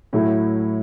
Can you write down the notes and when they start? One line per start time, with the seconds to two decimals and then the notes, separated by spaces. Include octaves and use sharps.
0.13 A2 F#3 A3 E4